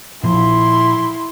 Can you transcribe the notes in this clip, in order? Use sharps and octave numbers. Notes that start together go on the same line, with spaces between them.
A#2 F3 E4 C6